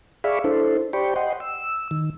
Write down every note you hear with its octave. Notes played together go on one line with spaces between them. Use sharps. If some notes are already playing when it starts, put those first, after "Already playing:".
G#4 D5 E5 F5 B5 C#6
D4 E4 A4 C5
G4 C5 D5 G5 B5 C#6
D#5 F#5 G5 C6
E6
D#3